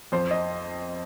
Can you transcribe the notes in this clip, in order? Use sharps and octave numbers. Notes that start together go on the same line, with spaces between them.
F2 C5
D#5